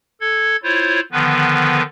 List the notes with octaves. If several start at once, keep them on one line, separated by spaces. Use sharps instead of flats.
A4 G#6
E4 F4 C5 C#5
D3 D#3 F3 B3 B4